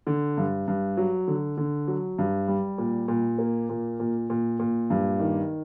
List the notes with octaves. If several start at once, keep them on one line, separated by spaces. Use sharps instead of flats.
D3
G2
G2
F#3
D3
D3
F#3
G2
G3
A#2
A#2
A#3
A#2
A#2
A#2
A#2
G2
D#3